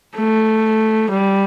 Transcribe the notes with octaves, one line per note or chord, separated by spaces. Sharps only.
A3
G3